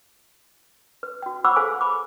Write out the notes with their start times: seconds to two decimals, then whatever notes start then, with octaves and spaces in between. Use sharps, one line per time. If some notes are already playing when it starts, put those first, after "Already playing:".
1.03 B4
1.22 F#4 G5
1.44 C5 F#5 B5 C#6 D6 E6
1.56 G#4 A4 B4 C5 F5 G#5
1.81 B5 D6